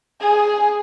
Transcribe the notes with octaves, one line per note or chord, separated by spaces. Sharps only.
G#4